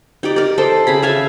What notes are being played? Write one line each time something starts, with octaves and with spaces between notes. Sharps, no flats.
D#4 G4 D5
A#4 D5
A4 C5 D#5
C#3 G#4 B5
E5 F5 G#5 A5